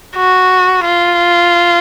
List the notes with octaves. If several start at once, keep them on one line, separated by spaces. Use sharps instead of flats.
F#4
F4